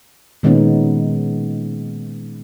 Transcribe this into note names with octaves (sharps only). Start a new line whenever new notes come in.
A#2 D#3 G#3 B3 C#4 D#4